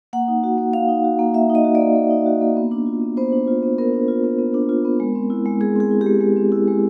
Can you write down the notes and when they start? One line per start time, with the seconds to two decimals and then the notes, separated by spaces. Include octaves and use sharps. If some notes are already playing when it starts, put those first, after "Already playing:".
0.13 A#3 F#5
0.28 D#4
0.44 F#4
0.58 A#3
0.73 A#3 F5
0.89 D#4
1.04 F#4
1.19 A#3
1.34 A#3 E5
1.50 D#4
1.55 D#5
1.65 F#4
1.75 D5
1.80 A#3
1.95 A#3
2.10 D#4
2.26 F#4
2.41 A#3
2.56 B3
2.71 D4
2.87 F4
3.02 B3
3.17 B3 C5
3.32 D4
3.48 F4
3.63 B3
3.78 B3 A#4
3.93 D4
4.08 F4
4.24 B3
4.39 B3
4.54 D4
4.69 F4
4.85 B3
5.00 G#3
5.15 C4
5.30 E4
5.45 G#3
5.61 G#3 G#4
5.76 C4 G#4
5.91 E4
6.01 G4
6.06 G#3
6.21 G#3
6.37 C4
6.52 E4
6.68 G#3